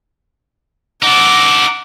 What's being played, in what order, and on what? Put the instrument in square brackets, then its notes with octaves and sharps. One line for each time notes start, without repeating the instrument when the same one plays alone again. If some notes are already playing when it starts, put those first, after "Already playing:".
[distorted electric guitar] D#4 A4 [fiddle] F#5 D6